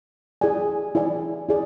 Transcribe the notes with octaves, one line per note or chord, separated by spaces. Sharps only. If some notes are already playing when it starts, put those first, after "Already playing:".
E4 G#4 D5 G#5
E4 G#4 D5 G#5
E4 G#4 D5